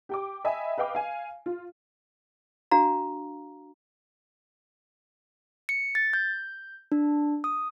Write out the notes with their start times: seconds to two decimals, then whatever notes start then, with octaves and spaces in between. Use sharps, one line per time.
0.09 G4 G5 D6
0.45 D#5 E5 G5 G#5 B5
0.78 B4 D#5 F5 G5 D6
0.95 F5 G#5
1.46 F4
2.71 D4 F#4 F5 A#5
5.69 C#7
5.95 A6
6.13 G6
6.92 D4
7.44 D#6